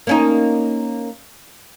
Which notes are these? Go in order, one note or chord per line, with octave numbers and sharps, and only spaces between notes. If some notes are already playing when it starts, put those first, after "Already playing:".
A#3 C#4 D#4